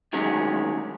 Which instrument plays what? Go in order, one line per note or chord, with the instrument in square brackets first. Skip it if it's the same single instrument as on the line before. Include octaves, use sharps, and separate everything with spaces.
[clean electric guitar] D2 D#3 F#3 G#3 C#4